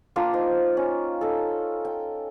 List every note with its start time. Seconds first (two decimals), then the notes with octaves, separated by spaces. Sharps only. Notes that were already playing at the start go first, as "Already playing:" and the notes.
0.16 A#3 D4 F4 G5
0.33 D#4 C5
0.77 C#4
1.21 D#4 A4
1.85 G5